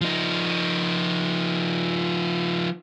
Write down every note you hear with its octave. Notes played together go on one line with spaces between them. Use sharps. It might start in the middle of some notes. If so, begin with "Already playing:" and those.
F3 D#4